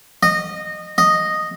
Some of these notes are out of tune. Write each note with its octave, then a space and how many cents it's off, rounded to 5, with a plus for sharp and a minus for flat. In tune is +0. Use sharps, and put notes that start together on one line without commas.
D#5 -20
D#5 -5